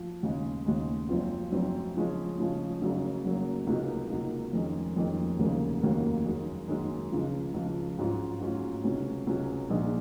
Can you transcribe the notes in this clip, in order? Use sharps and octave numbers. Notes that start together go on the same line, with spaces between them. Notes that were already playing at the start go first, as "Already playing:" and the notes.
Already playing: F3
D#2 C#3 G#3
D#2 C#3 G#3
F#1 F#2 F3 C4 F4
F#1 F#2 F3 C4 F4
C#3 F3 G#3 C#4
C#3 F3 G#3 C#4
F#1 F#2 C#3 F#3 A#3
F#1 F#2 C#3 F#3 A#3
C#2 C3 F#3 A#3 D#4
C#2 C3 F#3 A#3 D#4
F2 D#3 G#3 C#4
F2 D#3 G#3 C#4
F1 D#2 C#3 F#3 A#3
F1 D#2 C#3 F#3 A#3
F#2 D#3 G#3
F#2 D#3 G#3
C#2 C#3 F3
C#2 C#3 F3
G#2 F#3 C#4 F4
G#2 F#3 C#4 F4
C#2 C3 F#3 C#4
C#2 C3 F#3 C#4
A#1 A#2 G#3 D#4